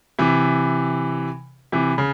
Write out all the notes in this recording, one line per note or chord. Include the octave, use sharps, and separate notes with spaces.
C3 E3
C3 E3
C#3